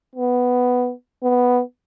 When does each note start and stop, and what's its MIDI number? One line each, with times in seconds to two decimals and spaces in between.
0.15 0.93 59
1.23 1.61 59